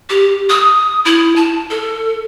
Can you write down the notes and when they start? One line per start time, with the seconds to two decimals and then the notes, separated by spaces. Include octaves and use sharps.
0.10 G4
0.50 D#6
1.05 E4
1.36 A5
1.70 A4